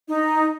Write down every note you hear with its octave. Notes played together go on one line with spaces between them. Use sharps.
D#4